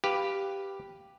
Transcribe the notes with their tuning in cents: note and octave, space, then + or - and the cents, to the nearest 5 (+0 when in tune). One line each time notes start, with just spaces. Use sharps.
G4 +0 B4 +0 F5 +0